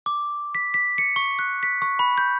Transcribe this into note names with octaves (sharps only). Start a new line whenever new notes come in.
D6
B6
B6
C#7
C#6
F#6
B6
C#6
B5
G6